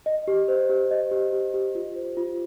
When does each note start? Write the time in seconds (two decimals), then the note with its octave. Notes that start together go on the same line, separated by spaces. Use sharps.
0.06 D#5
0.28 G4
0.48 C5
0.70 G4
0.91 D#5
1.11 G4
1.33 G4
1.54 G4
1.75 F4
1.96 C5
2.17 F4